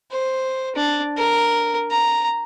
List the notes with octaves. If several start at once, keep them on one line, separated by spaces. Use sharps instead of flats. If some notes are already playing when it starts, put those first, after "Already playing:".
C5
D4
A#4
A#5